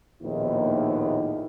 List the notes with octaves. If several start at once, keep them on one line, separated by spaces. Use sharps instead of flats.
A#1 D#2 A2 B3 D#4 E4